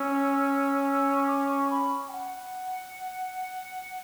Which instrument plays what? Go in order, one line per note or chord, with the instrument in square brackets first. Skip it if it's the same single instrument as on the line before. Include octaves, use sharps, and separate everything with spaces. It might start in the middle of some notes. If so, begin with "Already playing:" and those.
Already playing: [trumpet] C#4 [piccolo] E6
[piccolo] C#6
D6
C#6
B5
G5
F#5